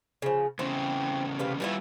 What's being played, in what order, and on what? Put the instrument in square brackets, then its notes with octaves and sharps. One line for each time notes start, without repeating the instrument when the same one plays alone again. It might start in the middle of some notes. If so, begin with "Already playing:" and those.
[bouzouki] C#3 F3
[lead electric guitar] E2 C#3 [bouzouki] C4 E4
[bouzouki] C3 B4 F5
[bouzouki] E3 B3 E4 [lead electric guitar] G3 F4